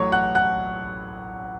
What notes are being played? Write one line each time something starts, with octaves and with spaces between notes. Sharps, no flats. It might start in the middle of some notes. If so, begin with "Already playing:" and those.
Already playing: A1 A2 F#3 C#5 C#6
F#5 F#6
F#5 F#6